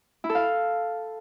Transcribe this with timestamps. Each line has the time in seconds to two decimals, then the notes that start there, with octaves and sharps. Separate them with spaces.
0.24 E4
0.29 A4
0.35 F5